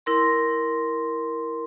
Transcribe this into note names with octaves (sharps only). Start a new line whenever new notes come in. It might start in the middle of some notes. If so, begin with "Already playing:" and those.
E4 A#4 C6